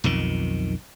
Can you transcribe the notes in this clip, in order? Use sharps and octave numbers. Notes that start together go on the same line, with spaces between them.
B1 F2 D#3